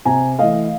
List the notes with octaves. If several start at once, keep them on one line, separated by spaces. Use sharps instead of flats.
C3 G#5 A#5
E3 A3 D#5 F5